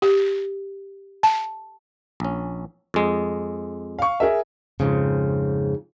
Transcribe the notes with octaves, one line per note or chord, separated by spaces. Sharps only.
G4
A5
A#1 C#4
F2 G#3
F5 C#6
G#4 A#4 E5
F2 G#2 C#3